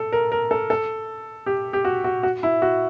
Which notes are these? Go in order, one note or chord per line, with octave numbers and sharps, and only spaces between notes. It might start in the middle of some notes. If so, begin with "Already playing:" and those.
Already playing: A4
A#4
A#4
A4
A4
G4
G4
F#4
F#4
F#4
E4
F#4